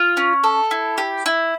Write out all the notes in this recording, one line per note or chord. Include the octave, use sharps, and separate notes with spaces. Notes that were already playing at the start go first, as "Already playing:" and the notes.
Already playing: F4
C#4
A4
E4
G4
E4